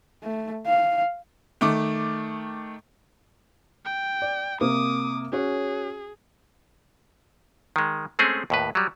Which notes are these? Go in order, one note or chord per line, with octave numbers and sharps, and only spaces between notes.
A3
F5
D#3 A3 D6
G5
D5
C3 A#3 D6 D#6
C#4 F#4 G#4 C#5
D#3 G#3
G#3 A3 C4 C#4 G#4
D#2 A2 B4
F#3 G3